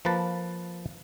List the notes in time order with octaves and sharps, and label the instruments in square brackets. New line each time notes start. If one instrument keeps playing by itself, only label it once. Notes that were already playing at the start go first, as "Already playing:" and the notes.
[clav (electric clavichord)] F3 A#3 B4 A5